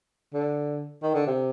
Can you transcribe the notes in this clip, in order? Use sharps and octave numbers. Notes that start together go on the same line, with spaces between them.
D3
D#3
D3
C3